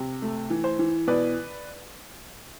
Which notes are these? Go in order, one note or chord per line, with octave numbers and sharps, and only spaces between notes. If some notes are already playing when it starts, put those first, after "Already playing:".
Already playing: C3
A3
E3
C5
E3
B2 B4 D5